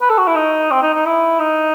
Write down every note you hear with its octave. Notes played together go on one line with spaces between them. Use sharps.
B4
A4
F#4
E4
D#4
C4
D#4
D#4
E4
D#4